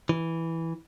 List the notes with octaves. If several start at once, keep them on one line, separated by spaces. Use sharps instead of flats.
E3